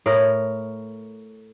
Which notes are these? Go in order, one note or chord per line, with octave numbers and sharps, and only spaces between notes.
A2 A#4